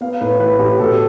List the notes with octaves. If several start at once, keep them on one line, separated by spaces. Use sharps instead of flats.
B3 F5
A2 B4
E3 B4
A2 G4
B2 A4